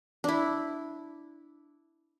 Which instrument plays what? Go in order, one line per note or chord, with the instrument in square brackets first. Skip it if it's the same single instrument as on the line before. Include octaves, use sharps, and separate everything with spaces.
[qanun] D4 E4